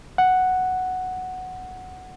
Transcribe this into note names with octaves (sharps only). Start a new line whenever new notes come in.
F#5